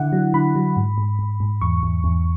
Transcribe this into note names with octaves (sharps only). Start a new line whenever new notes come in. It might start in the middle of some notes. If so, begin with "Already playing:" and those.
Already playing: D3 E4 F#5
F#3
D3 B5
F#3
G#2
G#2
G#2
G#2
E2 C#6
E2
E2